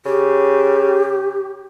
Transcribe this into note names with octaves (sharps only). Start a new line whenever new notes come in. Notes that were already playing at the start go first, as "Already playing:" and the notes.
C#3 G4